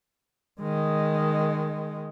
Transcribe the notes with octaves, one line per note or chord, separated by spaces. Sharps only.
D#3 G#3